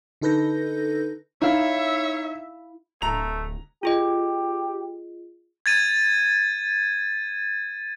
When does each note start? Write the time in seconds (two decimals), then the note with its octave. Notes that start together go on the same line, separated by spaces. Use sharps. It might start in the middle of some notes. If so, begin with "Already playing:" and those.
0.21 D3 D#4 A4 B4 G6 A#6
1.42 D#4 E4 C#5 E5 F5
3.02 D1 A3 A#5 F7
3.83 F4 G4 G#4 D#5
5.66 G#6 A6 D#7